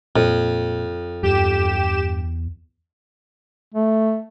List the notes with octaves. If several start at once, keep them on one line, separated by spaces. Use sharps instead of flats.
F2 A#2
E2 G2 G4 E7
A3